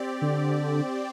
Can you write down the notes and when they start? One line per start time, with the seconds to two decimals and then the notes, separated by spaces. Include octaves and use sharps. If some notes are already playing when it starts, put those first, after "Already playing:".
Already playing: C4 G4 D5
0.22 D3